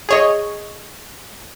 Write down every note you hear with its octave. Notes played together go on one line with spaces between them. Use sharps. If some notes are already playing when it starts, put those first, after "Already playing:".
G#4 C#5 D#5